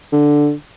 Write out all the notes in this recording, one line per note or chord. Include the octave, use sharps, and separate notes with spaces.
D3